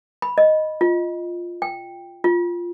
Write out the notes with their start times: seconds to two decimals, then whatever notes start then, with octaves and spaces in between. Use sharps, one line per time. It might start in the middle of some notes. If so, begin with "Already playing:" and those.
0.22 B5
0.38 D#5
0.81 F4
1.62 G5
2.24 F4